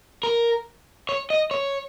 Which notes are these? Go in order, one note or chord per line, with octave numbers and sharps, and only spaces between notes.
A#4
C#5
D#5
C#5